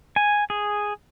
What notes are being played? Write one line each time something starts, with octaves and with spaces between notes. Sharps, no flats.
G#5
G#4